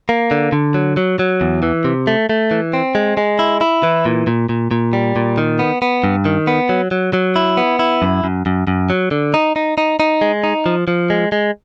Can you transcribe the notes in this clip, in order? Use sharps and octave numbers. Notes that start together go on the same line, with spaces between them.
A#3
D3
D3
F#3
F#3
F#3
E2
E3
C3
A3
A3
E3
C4
G#3
G#3
E4
E4
E3
A#2
A#2
A#2
A#2
G3
A#2
D#3
B3
B3
G2
D#3
B3
F#3
F#3
F#3
E4
B3
E4
F#2
F#2
F#2
F#2
F#3
D3
D#4
D#4
D#4
D#4
G#3
D#4
F3
F3
G#3
G#3